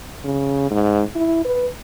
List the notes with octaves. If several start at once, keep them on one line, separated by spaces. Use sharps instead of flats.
C#3
G#2
E4
B4